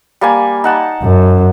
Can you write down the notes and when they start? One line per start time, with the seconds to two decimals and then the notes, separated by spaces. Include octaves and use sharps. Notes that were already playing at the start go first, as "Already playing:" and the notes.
0.21 G3 A#3 G#5
0.64 D#4 F#5 A5
1.02 F#2